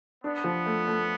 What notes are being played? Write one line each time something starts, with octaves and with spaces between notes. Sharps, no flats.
B3 D4
F3
A3
A3